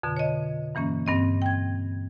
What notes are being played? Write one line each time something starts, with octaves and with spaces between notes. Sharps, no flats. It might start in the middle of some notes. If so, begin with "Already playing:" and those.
F2 B2 D3
C#5 D#5
G2 E3 A#3 C#4
G2 C4 D#5
G5 G#6